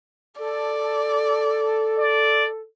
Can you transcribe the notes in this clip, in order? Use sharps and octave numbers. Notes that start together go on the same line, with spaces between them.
A4 D5
D5